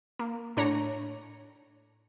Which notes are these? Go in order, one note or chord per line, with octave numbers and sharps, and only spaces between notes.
A#3
A2 D4 C#5 A#5